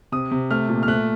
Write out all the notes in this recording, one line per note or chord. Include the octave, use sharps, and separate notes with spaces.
C3 D#6
C3
A3 F6
A#2
F6
A3 F#6